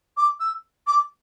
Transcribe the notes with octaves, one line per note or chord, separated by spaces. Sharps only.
D6
E6
D6